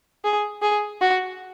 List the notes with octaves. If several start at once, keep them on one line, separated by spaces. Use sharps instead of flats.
G#4
G#4
F#4